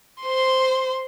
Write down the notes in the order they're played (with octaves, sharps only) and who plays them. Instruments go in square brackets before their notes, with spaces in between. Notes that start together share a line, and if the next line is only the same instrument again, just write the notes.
[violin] C5 C6